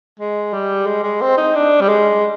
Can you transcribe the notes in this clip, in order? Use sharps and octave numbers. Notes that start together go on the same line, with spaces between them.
G#3
G3
G#3
G#3
C4
D#4
D4
G3
G#3